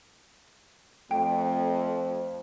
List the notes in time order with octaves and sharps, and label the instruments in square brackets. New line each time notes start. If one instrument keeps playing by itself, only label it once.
[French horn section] F2 [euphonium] A3 [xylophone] G5